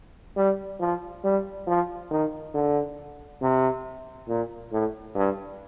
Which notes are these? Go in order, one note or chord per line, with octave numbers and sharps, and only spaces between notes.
G3
F3
G3
F3
D#3
D3
C3
A#2
A2
G2